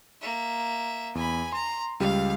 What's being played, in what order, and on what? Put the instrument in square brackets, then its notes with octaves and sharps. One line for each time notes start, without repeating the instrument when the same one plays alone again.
[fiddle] A#3 E5
[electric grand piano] E2 [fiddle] G#5 B5
[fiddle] A#5 [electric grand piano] C6
[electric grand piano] C#2 G3 [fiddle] F5